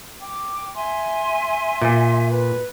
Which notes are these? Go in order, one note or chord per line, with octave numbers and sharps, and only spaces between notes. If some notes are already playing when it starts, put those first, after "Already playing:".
G5 D6
E5 G#5 C6
A#2
B4